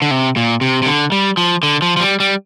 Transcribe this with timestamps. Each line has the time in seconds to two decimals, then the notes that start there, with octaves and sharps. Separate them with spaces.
0.02 D3
0.11 C3
0.36 A#2
0.61 C3
0.82 C3
0.86 D3
1.12 G3
1.37 F3
1.63 D3
1.82 F3
1.97 F3
2.00 G3
2.20 G3